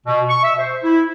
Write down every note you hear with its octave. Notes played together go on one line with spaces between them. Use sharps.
B2
C#6
E5
C5
E4